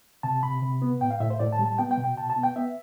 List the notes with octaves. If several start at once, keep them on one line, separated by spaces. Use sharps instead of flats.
C3 A5
C3 B5
C3
B3
A2 G5
F5
A2 E5
C5
A2 D5
A5
G3
A5
B3 G5
G5
B2
G5
B2 A5
A5
B3
G5
B3 E5